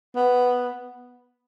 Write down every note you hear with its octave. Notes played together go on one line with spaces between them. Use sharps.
B3